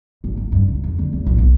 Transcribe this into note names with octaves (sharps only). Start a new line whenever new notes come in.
G#1
C#2
G2
C#2
F2
D3
E2
A#1
B1